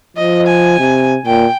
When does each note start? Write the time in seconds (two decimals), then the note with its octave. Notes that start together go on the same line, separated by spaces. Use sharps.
0.17 F3 D#5
0.47 G#5
0.79 C3
1.26 A#2 G5